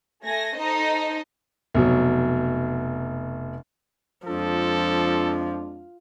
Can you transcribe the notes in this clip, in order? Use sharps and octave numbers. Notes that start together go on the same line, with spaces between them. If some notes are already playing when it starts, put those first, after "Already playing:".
A3 G#5 A#6
D#4 A4 C5 D#5
F1 B2 F#3
F2 F3 G#3 D4 F4 A4